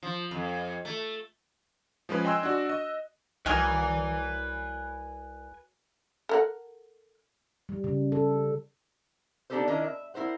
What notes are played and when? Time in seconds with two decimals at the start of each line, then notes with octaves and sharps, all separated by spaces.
0.03 F3
0.31 F2
0.85 A3
2.09 F3 G#3 C#4 B4
2.25 D#5 G5 G#5 C6 E6 F#6
2.43 D4 F#4
2.69 D#5
3.46 C2 F#3 G#4 A#4 B4 G#5
6.29 A4 A#4 F#5
7.69 G3
7.84 C#3
8.12 A4
9.50 B3 D4 D#4 G4 A4 C5
9.67 D#3 C#4 D4 E4 A#4 D#5
9.84 E5
10.14 E4 A#4 C5 F#5